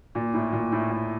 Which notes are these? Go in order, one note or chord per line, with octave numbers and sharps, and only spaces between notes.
A#2
A2
A#2
A2
A2